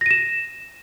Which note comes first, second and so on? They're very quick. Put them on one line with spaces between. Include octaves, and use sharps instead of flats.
A#6 D#7 E7